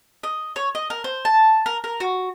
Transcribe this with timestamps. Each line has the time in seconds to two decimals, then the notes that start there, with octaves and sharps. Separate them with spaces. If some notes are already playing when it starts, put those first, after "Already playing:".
0.23 D#5
0.56 C#5
0.75 D#5
0.90 A#4
1.04 C5
1.25 A5
1.66 A#4
1.84 A#4
2.00 F#4